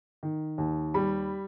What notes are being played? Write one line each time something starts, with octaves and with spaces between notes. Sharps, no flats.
D#3
D#2
G3 B5